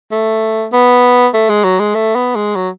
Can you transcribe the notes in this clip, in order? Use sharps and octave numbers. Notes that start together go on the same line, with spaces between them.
A3
B3
A3
G#3
F#3
G#3
A3
B3
G#3
F#3